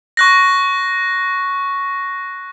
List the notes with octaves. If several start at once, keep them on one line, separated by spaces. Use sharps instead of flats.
C#6 F#6 A#6